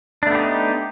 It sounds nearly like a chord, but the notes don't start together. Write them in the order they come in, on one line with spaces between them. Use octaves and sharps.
D4 A3 B3 G4 D#4